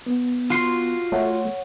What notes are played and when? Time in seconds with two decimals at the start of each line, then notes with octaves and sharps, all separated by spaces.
0.06 B3
0.50 F4 F#4 C6
1.12 A3 C#5 F#5